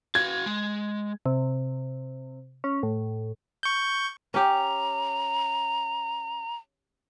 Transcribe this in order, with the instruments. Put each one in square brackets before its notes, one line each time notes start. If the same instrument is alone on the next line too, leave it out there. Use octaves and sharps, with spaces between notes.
[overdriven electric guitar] F#4 F5 [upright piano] G#6
[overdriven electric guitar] G#3
[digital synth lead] C3
C#4
A2
[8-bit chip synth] C#6 G6
[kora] C#4 G4 [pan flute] A#5